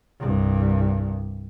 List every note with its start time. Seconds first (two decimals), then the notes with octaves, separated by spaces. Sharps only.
0.20 C2 G2